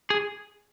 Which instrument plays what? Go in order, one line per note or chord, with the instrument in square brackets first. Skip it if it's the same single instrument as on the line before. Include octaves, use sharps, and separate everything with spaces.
[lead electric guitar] G#4